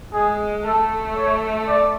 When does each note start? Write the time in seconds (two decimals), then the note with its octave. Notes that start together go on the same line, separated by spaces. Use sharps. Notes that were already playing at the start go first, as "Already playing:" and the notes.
0.13 G#3 G#4
0.65 A3 A4
1.17 C#5
1.68 D5